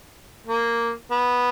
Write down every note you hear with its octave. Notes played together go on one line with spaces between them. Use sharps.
A#3
B3